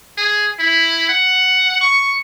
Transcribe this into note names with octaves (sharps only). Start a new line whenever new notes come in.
G#4
E4
F#5
C#6